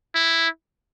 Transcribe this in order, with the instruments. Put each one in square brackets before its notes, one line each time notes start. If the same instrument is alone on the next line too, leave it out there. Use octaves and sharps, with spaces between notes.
[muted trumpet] E4